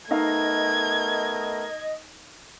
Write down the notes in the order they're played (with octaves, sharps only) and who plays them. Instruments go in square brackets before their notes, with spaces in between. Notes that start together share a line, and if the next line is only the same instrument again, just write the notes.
[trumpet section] A3 B3 A#4 [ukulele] D#4 F5 [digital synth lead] D#5 [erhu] G#6